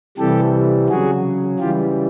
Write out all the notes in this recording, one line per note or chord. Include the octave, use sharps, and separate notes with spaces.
C3 E3 G3 G4 A4
C#3 F#3 F#4 G#4
C#3 E3 G3 F4 G4